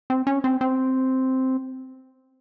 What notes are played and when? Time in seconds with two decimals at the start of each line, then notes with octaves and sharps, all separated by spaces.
0.10 C4
0.27 C#4
0.44 C4
0.61 C4